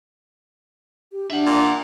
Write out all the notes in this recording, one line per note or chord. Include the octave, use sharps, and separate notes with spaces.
G4
D4 E5 F#5
A#2